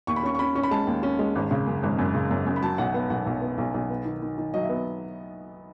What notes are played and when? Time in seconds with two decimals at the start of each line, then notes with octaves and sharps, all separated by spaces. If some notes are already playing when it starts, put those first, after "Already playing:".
0.07 D#2 C#6
0.16 B5
0.23 C#4 C#6
0.35 C#6
0.39 C#4 B5
0.55 C#4 C#6
0.63 B5
0.71 G#3 A5
0.87 D#2
1.03 C#4
1.19 G#3
1.35 G#1
1.51 C#3
1.67 F#2
1.83 G#1
1.98 F#2
2.14 C#3
2.31 F#2
2.46 F#2
2.56 B5
2.62 F#3 A5
2.78 B1 F#5
2.94 B3 F#5
3.10 B1 F#5
3.26 B1
3.41 B3
3.58 B1
3.74 B1
3.90 B3
4.05 D#3
4.22 D#3
4.38 D#3
4.54 F#3 D#5
4.63 E5
4.69 B3